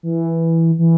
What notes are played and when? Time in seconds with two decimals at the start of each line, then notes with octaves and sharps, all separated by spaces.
0.03 E3
0.79 E3